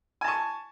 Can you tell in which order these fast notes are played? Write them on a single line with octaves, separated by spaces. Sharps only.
G#5 A5 C#6